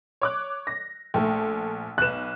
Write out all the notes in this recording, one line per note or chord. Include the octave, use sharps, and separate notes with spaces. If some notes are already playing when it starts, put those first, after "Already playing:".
C#5 D6 F#6
A#6
A#1 A3 A4 G5
B1 B4 F#6 E7